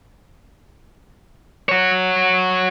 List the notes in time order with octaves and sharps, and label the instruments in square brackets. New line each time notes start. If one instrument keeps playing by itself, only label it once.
[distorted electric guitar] F#4 C#5